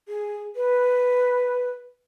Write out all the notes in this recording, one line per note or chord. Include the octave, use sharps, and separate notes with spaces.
G#4
B4